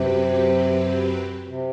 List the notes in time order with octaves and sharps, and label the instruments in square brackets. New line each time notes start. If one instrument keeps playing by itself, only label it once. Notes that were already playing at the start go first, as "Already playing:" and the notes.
Already playing: [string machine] F#2 F#3 C4 G4 B4 [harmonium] C3
[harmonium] C3